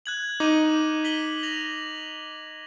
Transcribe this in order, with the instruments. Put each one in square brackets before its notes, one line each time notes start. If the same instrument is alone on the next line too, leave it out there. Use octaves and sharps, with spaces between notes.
[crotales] F#6 G#6 F#7
[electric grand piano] D#4 [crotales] D6 D#7
[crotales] B6 F#7 G7
A#6 F7 F#7